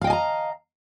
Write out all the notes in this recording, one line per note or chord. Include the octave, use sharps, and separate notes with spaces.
D#5 F5 G5 G#5 A#5